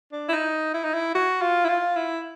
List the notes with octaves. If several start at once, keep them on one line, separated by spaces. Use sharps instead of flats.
D4
E4
D#4
E4
D#4
E4
F#4
F4
E4
F4
E4